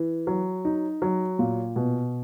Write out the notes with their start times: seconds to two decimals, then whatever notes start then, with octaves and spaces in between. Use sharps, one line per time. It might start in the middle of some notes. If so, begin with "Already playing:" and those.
Already playing: E3
0.27 F#3
0.65 D#4
1.02 F#3
1.39 A#2
1.76 B2